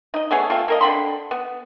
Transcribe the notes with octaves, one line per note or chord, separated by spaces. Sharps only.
D#4 D#5
A3 B3 G#4 C#5
A3 C4 F4
A#3 A#4 D#5
D3 C4 B5 C6
B3